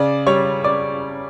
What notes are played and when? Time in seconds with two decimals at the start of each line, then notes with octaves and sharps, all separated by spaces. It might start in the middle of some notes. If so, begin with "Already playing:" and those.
Already playing: C#3 D5 D6
0.26 G3 C#5 C#6
0.64 D5 D6